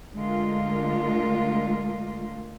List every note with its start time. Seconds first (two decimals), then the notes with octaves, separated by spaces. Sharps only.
0.14 D3 G#3 A3 F4 A#4